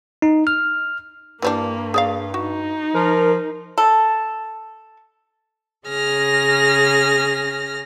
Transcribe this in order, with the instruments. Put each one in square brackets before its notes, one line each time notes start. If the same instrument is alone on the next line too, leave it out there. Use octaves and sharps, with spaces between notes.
[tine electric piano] D#4
F6
[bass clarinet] G2 [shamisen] E3 G3 D4 [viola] A#3
[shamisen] G#4 D5 F5
[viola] D#4 [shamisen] F#4
[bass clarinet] F3 [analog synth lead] A#4
[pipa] A4
[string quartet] C#3 G#4 F6 A#6